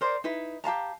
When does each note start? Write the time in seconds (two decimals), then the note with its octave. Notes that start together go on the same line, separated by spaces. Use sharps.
0.01 A#4 C5 D5
0.24 D#4 E4 B4
0.64 G4 F5 A5 A#5